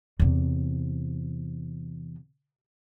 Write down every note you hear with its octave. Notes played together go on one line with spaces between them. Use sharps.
E2 C3